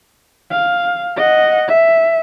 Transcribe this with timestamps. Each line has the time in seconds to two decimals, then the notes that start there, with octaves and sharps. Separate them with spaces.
0.51 F5
1.16 D#5 F#5
1.68 E5